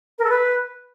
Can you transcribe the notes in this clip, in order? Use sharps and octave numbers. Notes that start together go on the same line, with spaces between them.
A#4
A4
B4